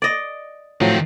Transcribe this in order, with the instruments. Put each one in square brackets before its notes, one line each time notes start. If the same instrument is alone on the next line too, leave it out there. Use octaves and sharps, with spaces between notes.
[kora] D5 D#5
[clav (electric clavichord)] A2 F3 F#3 [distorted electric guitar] D#3 C4